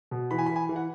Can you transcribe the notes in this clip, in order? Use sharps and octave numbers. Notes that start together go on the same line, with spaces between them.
B2
E3 B5
G#5
B5
E3
G#5
E3
F#5